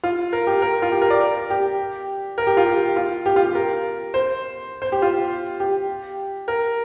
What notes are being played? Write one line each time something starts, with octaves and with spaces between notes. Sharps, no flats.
F4
A#4
G4
A#4
F4
G4
A#4
D5
A#4
G4
A#4
G4
F4
G4
F4
G4
F4
G4
A#4
C5
C5
G4
F4
G4
A#4